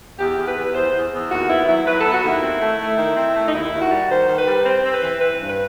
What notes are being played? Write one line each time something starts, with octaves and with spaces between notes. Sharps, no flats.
E2 G4
E2
B4
E2
E2 C5
E2
E2
D#2 F#4
B3 E4
F#3 E4
F#3 B4
B3 A4
F#4
D#2
E4
C4
A3
A3
D#3
C4
A3
D#4
D#2 E4
D#2
F#4
G3
D#3 C5
D#3
B4
G3
C4 C5
C4
B4
E3
C4 B4
G2
B4